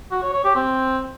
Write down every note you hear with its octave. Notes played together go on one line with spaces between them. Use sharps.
F#4
C#5
C#5
G4
C4